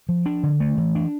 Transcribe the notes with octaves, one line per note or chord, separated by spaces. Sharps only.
F3
D4
D3
A3
E3
D4